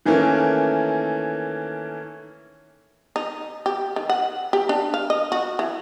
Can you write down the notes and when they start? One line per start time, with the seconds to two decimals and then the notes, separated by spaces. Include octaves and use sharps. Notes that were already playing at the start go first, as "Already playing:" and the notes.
0.06 D#3 E3 A3 A#3 C#4
3.16 D#4
3.66 G4
3.96 D#3
4.09 F#5
4.53 G4
4.69 D4
4.94 F5
5.10 D#5
5.32 F#4
5.59 E3